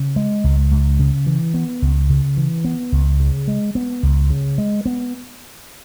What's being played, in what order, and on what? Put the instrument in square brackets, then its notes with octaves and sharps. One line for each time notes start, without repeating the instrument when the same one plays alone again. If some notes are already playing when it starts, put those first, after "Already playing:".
Already playing: [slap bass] C#3
G#3
C#2
C#2
C#3
E3
B3
C#2
C#3
E3
B3
C#2
C#3
G#3
B3
C#2
C#3
G#3
B3